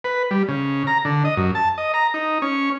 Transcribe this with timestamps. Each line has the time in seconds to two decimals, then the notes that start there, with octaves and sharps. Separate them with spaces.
0.04 B4
0.31 G3
0.48 C#3
0.87 A#5
1.05 D3
1.25 D#5
1.37 F#2
1.55 A5
1.78 D#5
1.94 A#5
2.14 D#4
2.42 C#4